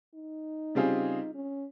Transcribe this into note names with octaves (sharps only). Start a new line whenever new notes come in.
D#4
C#3 G3 C4 F4 G#4
C#4